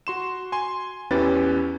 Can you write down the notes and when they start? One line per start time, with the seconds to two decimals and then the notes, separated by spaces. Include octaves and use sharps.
0.07 F#4 C6 E7
0.52 G#5 C6
1.11 E2 E3 C#4 G4 B4 A6